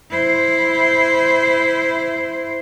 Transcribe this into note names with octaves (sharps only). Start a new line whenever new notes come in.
E4 C5